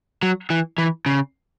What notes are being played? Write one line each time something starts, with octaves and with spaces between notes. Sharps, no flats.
F#3
E3
E3
C#3